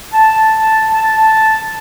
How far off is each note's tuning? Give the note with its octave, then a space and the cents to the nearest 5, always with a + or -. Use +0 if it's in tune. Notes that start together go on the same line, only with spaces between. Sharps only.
A5 +0
A5 -5